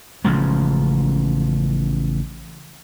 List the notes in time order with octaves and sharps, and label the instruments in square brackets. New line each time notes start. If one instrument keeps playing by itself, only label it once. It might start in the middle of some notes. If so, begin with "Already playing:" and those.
[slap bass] A1 C#3 F3 G#3